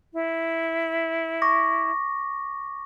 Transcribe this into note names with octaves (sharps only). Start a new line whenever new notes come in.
E4
C#6 D6 A#6